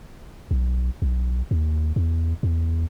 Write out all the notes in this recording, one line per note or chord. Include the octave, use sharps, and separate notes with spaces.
B1
B1
D#2
E2
E2